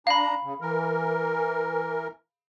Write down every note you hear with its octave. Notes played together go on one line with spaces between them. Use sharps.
D4 F5 A#5 B5
C#3
E3 A#4